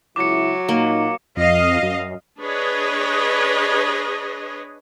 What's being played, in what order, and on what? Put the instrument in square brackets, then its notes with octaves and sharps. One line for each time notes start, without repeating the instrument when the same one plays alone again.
[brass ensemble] C#2 E4 [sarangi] F#3 [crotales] D6 C#7
[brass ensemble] A#2 D#4 [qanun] A#3
[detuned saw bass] F2 [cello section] D#5 F5
[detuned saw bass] F#2
[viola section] D4 G#4 B4 C#5 D#5